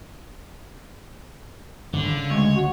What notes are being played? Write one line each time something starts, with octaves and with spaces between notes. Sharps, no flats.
G#2 D3 D#3 G3
C#3
D2 G#3 C#5
F#4